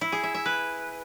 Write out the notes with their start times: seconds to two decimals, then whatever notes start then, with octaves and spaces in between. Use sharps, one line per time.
0.01 E4
0.12 G#4
0.23 E5
0.34 E5
0.46 B4